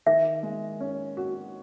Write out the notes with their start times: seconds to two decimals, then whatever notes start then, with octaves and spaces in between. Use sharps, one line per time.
0.06 D#3 E5
0.43 G#3
0.80 C#4
1.17 F#4